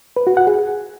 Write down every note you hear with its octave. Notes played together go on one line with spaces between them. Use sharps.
B4
F#4
F#5
G#4